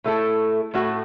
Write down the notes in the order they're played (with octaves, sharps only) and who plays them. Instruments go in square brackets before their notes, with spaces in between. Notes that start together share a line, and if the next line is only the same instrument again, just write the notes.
[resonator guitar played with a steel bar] A2 A3 E4 A4
A2 A3 F#4